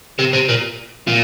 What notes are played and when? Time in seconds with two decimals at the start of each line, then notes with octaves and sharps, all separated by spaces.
0.19 C3
0.33 C3
0.49 A#2
1.07 A#2